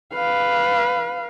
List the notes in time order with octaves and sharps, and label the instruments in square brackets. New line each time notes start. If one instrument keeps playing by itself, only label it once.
[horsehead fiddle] B4 F5